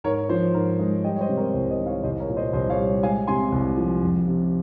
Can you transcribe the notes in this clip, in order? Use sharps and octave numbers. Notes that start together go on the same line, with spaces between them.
G#2 A#4 C#5
F3 C5
G#2 A#4
G#3
G3 D#5 G5
C#5
C5 D#5
C3
A#4 C#5
C2 C5
C5 D#5
D#3
C#5 F5
C2 C5 D#5
A#4 C#5
A#2
C5 D#5
C2 C5 D#5
C#5 F5
G3
G#3 F5 G#5
C3 G#5 C6
C2
F3
F2
C3